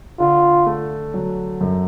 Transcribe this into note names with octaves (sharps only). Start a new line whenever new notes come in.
D3 F4
A3
F#3
F#2